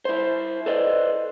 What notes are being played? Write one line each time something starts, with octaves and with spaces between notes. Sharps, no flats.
E4 C5
A4 B4 C5 D5 D#5